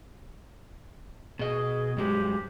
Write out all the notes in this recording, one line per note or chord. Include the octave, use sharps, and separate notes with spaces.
B2 G#4 D#5
G2 F#3 G#3 G4